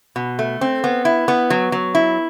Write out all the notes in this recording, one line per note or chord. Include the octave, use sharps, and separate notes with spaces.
B2
A3
C4
B3
E4
B3
F#3
F#3
E4